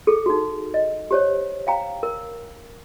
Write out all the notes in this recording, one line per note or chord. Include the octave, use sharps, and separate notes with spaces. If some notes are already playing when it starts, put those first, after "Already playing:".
G#4 A4
D#4 F#4
D#5
G4 C5 C#5
F5 G5 A#5
A#4